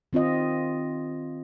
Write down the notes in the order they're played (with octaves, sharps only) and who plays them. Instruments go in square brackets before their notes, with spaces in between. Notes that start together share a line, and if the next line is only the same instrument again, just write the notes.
[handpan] D#3 C4 F4 D#5